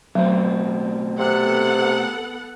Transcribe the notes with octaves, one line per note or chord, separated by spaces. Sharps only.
B2 F#3 A3 C4
C3 B3 A4 F#5